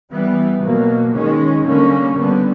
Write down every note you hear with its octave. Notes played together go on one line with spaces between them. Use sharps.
E3 G3 B3
B2 F#3 A#3
D#3 G#3 C#4
D3 G3 A#3 C#4
D3 G3 B3